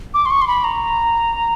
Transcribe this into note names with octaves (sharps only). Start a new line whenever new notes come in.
D6
C6
C#6
C6
B5
A#5